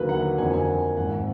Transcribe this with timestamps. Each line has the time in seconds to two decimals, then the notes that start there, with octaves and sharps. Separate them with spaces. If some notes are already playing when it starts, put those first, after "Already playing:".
Already playing: D#2 D3 F#3 A#3 B4
0.09 F#5
0.38 F2 D3 F3 A#3 G#5
0.53 G#5
0.97 G#1 G#2 D#3 F#5